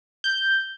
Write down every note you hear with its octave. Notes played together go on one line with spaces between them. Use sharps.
G6